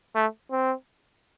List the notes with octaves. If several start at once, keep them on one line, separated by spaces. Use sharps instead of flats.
A3
C4